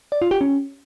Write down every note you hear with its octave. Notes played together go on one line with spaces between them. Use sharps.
D5
F4
G4
C#4